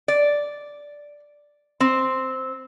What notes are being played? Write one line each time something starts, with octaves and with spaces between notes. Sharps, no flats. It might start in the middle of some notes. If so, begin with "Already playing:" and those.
D5
C4